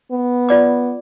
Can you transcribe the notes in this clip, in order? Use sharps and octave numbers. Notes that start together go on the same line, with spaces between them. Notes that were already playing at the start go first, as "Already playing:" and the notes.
B3
F4 D5 D6